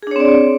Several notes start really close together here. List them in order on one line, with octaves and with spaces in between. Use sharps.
G#4 D4 C#5 C4 D5